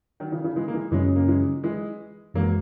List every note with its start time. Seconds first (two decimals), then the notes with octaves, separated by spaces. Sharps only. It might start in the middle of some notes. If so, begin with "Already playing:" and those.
0.20 D#3 F#3
0.32 C#3 E3
0.44 C#3 E3
0.56 E3 G#3
0.68 A#3
0.74 E3 G#3
0.92 F#2 C#3 E3 F#3 G#3 C#4
1.16 A#3
1.28 E3 G#3
1.64 E3 G#3
2.35 F#2 E3 F#3 G#3 A#3